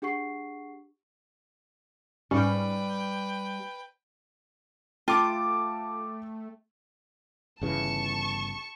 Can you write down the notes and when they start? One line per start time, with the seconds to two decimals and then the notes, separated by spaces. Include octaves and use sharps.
0.02 D4 G4 G#4 F#5 C#6 C7
2.31 G#2 G3 C#4 B4 G5
5.08 A3 F4 G5 A5 D6
7.61 G1 C#3 E3 A5 C#6